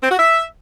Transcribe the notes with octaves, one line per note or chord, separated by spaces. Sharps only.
C4
F#4
E5